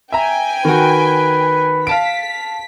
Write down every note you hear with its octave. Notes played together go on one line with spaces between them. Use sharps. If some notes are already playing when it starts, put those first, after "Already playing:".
E5 G5 G#5 A#5
D#3 F#4 B4
F5 A5 B6 D7